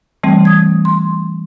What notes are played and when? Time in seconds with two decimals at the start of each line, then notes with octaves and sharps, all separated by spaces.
0.23 E3 G3 A3 C4
0.45 D#6 G#6
0.85 C6